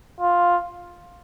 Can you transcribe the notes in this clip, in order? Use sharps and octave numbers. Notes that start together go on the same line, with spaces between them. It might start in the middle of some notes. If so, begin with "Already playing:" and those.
F4